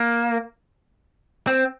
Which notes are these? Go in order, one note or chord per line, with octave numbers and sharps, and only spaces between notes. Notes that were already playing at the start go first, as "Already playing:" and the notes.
Already playing: A#3
C4